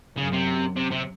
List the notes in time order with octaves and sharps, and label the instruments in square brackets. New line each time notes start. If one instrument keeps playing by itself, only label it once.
[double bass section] F#2 [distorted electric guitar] C#3
[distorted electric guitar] C3
C3
C3